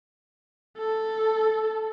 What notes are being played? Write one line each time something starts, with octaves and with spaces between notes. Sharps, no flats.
A4